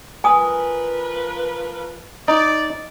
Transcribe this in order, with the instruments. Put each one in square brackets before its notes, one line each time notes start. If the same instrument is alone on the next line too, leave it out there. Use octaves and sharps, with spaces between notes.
[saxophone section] F3 A#4 B4 [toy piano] G#5 D#6
[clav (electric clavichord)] D#4 [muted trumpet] D5